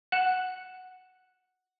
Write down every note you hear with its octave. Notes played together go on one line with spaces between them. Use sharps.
F#5 F#6 E7 F#7